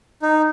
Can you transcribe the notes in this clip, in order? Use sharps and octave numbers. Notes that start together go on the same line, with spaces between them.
D#4